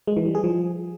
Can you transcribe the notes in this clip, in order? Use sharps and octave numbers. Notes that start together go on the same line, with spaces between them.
G#3
E3
G3
G#4
F3